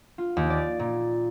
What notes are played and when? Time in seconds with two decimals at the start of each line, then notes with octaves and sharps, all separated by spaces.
0.18 F4
0.37 D#2
0.50 D5
0.79 A#2